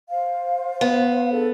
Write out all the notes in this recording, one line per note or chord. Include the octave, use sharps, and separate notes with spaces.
C5 F5
B3
D4 G#4 A4